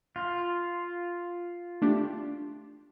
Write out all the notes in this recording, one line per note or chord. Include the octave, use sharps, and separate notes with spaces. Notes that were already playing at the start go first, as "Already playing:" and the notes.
F4
A3 D4 G4